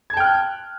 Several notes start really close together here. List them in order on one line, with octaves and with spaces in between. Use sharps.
G#6 A5 G5 F6 F#6